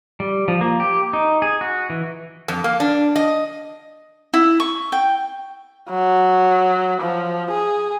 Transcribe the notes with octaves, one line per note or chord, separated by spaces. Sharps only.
G3
F3
A#3
G4
D#4
G#4
F#4
E3
F2
A#3
D4
D#5
E4
C#6
G5
F#3
F3
G#4